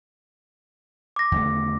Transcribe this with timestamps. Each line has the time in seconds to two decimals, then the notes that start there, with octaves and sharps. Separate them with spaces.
1.16 D6 A#6
1.32 E2 D3 A3